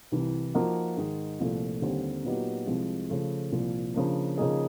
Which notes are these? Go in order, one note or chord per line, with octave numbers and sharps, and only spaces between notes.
C2 C3 E3
F3 A#3 D#4 F#4
G#2 D#3 G#3
C2 A#2 F3 A3
D#2 D3 G3 C4
A#2 F#3 B3 D#4 G4
C2 C3 F3 G#3
C#3 F3 A3
C2 A#2 F3
C#3 F3 A#3 D4
C#3 F3 A#3 D#4 G#4